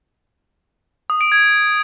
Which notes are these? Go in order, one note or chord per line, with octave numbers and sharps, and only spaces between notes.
D#6
D7
G#6